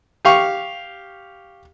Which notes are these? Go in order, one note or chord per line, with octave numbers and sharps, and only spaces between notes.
G4 F5 C#6